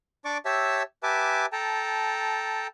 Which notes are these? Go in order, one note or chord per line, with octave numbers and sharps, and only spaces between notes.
D4 D5 C#6 D6
G4 C#5 E5 A5 E6
G4 B4 E5 G#5 A5 D6
A4 G5 A5 A#5